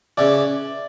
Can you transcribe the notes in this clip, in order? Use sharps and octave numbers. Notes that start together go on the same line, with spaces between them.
C#3 E3 D5